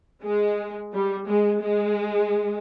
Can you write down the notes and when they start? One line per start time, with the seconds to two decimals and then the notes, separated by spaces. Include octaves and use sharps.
0.23 G#3
0.92 G3
1.27 G#3
1.61 G#3